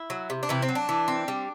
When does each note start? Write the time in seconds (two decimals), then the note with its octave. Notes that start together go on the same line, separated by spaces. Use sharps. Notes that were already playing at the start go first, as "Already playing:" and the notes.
Already playing: E4
0.10 F#3
0.30 C3
0.43 D4
0.49 C3 E3 E4
0.62 C4
0.69 F#3
0.75 D4
0.89 E3
1.08 C4
1.28 G3